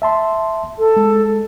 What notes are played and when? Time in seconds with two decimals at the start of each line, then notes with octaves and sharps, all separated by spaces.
0.02 E5 A5 C6
0.78 A4
0.97 G#3